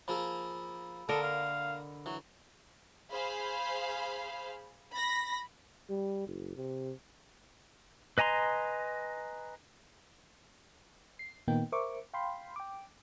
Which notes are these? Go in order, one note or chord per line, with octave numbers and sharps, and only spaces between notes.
F3 A#3 G#4 B5 E6
D3 A#3 A4 A#4 D#5
F5
E3 F#3
G#4 C5 F5 B5
B5 A#6
G3
F#1
C3
B4 D#5 G#5 A#5 C6
C7
A#2 D#3 A#3 B3 D#4 G5
A#4 C5 E5 C#6 D6
F5 G5 B5 C6
G5 D6